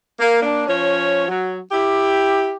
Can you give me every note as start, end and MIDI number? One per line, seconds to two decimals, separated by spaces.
0.20 0.40 58
0.42 0.65 58
0.42 0.65 62
0.67 1.28 53
0.67 1.28 61
0.67 1.28 73
1.28 1.59 54
1.72 2.53 64
1.72 2.53 67